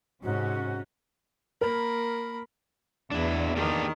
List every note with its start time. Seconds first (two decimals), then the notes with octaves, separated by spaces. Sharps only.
0.24 G#2 C3 C#4 F#4
1.61 A#3 A#4 B5
3.11 E2 D4 E4
3.56 D#3 A#3 D4 G4